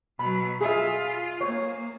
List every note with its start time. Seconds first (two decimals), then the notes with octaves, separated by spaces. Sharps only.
0.19 B2 F#3 B5
0.61 F4 G#4 E5
1.41 A#3 C#5